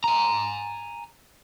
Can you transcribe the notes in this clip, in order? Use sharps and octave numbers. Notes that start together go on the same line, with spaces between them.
G#5 A#5